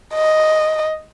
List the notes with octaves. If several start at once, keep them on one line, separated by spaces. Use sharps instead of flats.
D#5